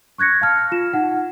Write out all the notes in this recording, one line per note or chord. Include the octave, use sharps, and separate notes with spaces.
C#6 F#6 G#6 A#6 C#7
F5 A5 F6
F4 E7
D#4 F#5